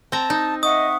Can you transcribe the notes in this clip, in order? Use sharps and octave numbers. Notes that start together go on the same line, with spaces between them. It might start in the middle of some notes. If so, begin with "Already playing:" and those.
C4 A5 A#5
D#4
D#5 E5 F#5 C#6 D#6